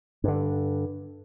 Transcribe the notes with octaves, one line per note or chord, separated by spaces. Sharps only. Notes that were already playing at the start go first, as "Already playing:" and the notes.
G2 D3